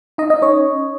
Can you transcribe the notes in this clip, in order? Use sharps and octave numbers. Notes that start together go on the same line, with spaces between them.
D#4 D#5
D#4 D#5
C#4 C#5